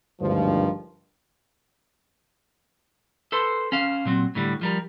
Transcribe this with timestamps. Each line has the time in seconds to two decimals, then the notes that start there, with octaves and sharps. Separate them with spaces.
0.21 G#1 D2 G2 D#3 F3
3.32 A4 B4 C5 C6
3.72 C#4 C5 F5
4.05 A#2 F#3 C4
4.35 A2 D3 G3
4.61 F3 G3 A#4